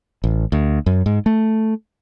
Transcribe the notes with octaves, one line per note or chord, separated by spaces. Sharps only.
A1
D2
F#2
G#2
A3